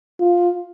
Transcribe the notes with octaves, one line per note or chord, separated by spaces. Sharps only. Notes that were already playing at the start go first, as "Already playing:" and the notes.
F4